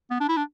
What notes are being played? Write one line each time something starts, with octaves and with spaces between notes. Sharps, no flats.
B3
D4
E4
D4